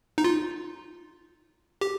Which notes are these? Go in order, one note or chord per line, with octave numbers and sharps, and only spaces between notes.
D#4
F4
G4